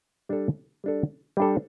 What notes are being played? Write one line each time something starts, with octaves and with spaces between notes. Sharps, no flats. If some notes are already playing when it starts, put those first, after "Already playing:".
G3 D4 A4
G3 D4 A4
G3 D4 A4